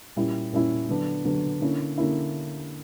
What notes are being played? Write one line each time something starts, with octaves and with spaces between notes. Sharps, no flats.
A#2 G3 C#4 E4
A#2 G3 C#4 E4
D3 F#3 B3 D4
D3 F#3 B3 D4
D3 A#3 C#4 E4
D3 A#3 C#4 E4